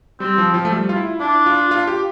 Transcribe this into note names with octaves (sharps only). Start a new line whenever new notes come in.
G3 C4
F3
F3
A3
G3
F4
E4
D4 E4
F4
F4
G4